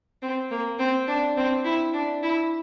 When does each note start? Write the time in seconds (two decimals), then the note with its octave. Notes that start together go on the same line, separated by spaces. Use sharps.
0.22 C4
0.51 A#3
0.79 C4
1.08 D4
1.37 C4
1.64 E4
1.93 D4
2.23 E4